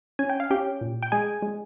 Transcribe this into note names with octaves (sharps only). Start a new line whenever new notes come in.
C#4 G#5
G5
F5
C#4 G4 G5
A#2
G5
G#3 G#4 G#5
G#3